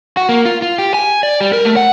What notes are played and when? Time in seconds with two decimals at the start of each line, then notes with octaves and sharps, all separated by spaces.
0.17 F#4
0.29 A#3
0.45 F4
0.62 F4
0.78 G4
0.94 G#5
1.23 D5
1.41 G3
1.53 A#4
1.65 A3
1.76 F#5